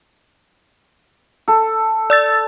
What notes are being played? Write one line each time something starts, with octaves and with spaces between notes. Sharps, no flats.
A4
D5 E6 A6